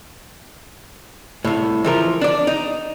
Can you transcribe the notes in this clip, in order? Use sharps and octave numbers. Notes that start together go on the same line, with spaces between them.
C2 A2
E3 F3 A#4
D4 D5
D#4